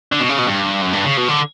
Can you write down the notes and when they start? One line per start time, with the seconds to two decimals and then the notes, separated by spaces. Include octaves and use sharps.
0.12 D3
0.20 B2
0.29 C#3
0.38 B2
0.47 G2
0.82 F#2
0.93 G2
1.05 C#3
1.18 B2
1.29 D3